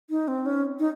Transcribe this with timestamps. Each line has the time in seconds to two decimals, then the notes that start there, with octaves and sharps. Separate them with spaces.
0.10 D#4
0.28 C4
0.46 C#4
0.79 D#4